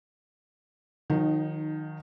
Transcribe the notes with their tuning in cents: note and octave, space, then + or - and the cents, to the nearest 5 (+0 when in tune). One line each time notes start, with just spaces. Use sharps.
D#3 +0 F#3 -45 D#4 -15